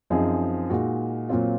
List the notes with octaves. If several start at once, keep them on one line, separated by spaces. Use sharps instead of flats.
F#2 F3 C4 D#4 G#4
A#2 G#3 D#4 F#4
A#2 F#3 C4 F4